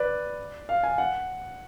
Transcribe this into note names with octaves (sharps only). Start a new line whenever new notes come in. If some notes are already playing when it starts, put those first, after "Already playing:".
Already playing: B4 D5
F5
G#5
F#5